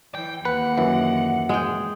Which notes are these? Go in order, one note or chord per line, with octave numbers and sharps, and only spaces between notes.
E3 G5
D#2 B4 F#5
F#2 E3
G#3 G5